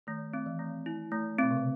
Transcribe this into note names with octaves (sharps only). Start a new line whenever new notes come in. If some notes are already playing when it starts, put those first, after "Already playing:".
D#3 A3
C4
E3
A3
E4
A3
B2 C4
C3
C#3